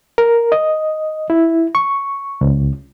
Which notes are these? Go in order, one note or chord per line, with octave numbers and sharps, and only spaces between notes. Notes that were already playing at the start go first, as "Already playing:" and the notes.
A#4
D#5
E4
C#6
C#2